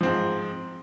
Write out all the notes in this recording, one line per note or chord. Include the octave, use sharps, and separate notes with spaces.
G#2 F3 C4